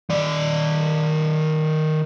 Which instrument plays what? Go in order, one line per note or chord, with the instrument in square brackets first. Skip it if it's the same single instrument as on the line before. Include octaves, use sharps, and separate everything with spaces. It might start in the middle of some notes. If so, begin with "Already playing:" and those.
[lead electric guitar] D#3 D5